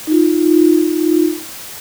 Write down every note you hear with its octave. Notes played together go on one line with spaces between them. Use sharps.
D#4 F4